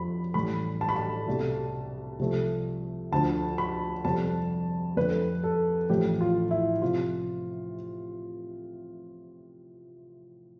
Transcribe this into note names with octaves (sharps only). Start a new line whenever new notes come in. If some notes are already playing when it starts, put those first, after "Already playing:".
Already playing: F2 F3 B5
A1 A2 G3 B5
A5
B5
A5
C2 B2 A3
C2 C3 F3 A3
D2 D3 F3 A3 A5
B5
F2 C3 G3 A5
F2 D3 A3 B4
A4
A1 A2 F3 A3 G4
F4
E4
C3 F3 F4